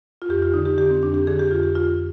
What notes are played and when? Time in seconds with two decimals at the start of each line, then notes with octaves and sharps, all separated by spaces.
0.22 F4
0.29 F2 G4
0.42 F4
0.54 D3 D#4
0.66 G4
0.78 D3 G4
0.90 C4
1.02 F2 D4
1.14 G4
1.27 D3 G#4
1.39 G4
1.51 F2 F4
1.63 G4
1.75 F2 F4